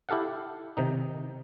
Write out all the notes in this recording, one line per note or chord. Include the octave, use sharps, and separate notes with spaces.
E4 G4 A4 F5 F#5
C3 D#3 D#4